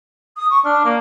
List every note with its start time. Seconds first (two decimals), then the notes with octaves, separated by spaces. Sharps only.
0.37 D#6
0.50 C#6
0.65 D4 F6
0.85 A#3